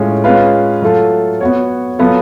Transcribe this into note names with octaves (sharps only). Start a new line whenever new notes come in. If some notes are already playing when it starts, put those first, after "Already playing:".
Already playing: A2 G#3 C#4 F4
G#3 C#4 F4 B4
F#3 A3 F4 A4
B3 F#4 C#5
F#3 B3 F4 A4